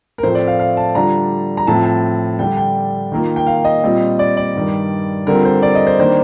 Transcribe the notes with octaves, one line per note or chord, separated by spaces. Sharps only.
A#4
A2 F3 A3 C4 C5
D5
F5
F5
A5
D3 G3 D4 F4 A#5
A#5
A2 F3 C4 F4 A5
A5
D3 G3 D4 G5
G5
D#3 A#3 F4
G5
F5
D#5
A#2 G3 C4 F4
D5
D5
G2 D#3 G3
D3 G3 C4 F4 A#4
C5
D5
D#5
C5
D#3 G3 A#3 D4 C5